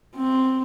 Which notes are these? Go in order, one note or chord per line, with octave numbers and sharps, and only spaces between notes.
C4